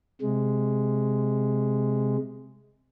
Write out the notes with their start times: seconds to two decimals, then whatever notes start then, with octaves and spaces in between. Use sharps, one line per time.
0.21 C3 G#3